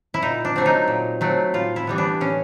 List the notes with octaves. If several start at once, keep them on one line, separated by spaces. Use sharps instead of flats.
E4
A#2 D#4
D4
F#3 A3 C4
D#4
A#2
F#3 A3 C4
A2 F4
E4
E3 G3 B3
D4
A2 C#4